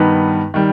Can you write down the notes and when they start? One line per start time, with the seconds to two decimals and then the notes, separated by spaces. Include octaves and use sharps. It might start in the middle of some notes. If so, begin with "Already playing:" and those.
Already playing: G2 D#3 B3 D#4 B4
0.54 D#3 G3